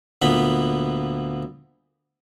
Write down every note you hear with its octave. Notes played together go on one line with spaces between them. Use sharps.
D2 A#2 B3 B5